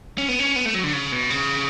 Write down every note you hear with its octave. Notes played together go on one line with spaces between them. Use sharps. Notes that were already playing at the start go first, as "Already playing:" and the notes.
C#4
B3
C#4
B3
A3
F#3
D3
C#3
B2
C#3